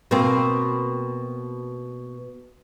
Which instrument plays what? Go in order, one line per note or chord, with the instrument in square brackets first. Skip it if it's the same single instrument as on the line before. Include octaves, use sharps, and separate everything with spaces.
[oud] B2 A#3 C4